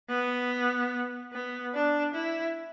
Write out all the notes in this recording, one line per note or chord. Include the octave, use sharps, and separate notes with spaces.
B3
B3
D4
E4